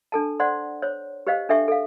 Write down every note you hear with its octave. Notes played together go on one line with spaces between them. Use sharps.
D4 A4 A5
C5 D5 F#5 C6
C5 C#5
G4 B4 C5 D#5 F5
D4 A4 E5 G5 C#6
A4 F5